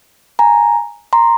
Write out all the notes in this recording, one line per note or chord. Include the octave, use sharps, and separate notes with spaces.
G#5 A#5
A#5 C6